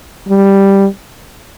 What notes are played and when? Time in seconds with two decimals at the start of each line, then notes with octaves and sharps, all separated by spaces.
0.29 G3